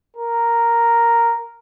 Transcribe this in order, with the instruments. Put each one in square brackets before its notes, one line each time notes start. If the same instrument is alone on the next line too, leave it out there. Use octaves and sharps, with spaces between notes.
[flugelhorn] A#4